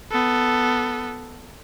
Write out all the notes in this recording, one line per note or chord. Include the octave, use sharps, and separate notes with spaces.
B3 A4